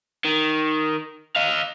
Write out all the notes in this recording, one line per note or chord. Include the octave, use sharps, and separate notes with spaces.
D#3
D#5 F5